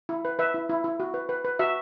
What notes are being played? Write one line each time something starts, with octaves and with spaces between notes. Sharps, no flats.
E4
B4
B4 E5
E4
E4
E4
F#4
B4
B4
B4
F#4 E5